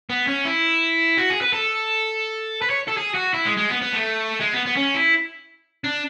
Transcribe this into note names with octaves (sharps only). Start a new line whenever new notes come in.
B3
C#4
E4
F#4
G#4
B4
A4
B4
C#5
A4
G#4
F#4
E4
G#3
G#3
B3
B3
A3
G#3
B3
B3
C#4
E4
D4